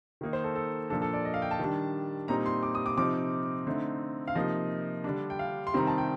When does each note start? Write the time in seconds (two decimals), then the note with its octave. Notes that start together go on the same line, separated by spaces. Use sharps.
0.21 D#3 A#3 D#4
0.33 C5
0.44 A4
0.56 A4
0.90 A#2 F3 A#3 D4 A4
1.02 A4
1.14 D5
1.25 D#5
1.34 F5
1.42 G5
1.51 A5
1.59 D#3 G3 D4
2.28 A#2 G3 C4 D#4 A#5
2.46 C6
2.63 D6
2.75 D#6
2.86 D6
2.97 C3 F3 C4 D#4 D6
3.67 D3 A3 C4 D#4
4.28 F5
4.35 C3 F3 A#3 D#4 D#5
5.04 D3 G3 D4
5.30 G5
5.39 F5
5.67 C6
5.73 C3 D#3 G3 C4 D#4 A#5
5.87 A5
5.98 G5